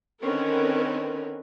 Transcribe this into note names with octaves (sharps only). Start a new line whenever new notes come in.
D3 D#3 C4 C#4 A#4 B4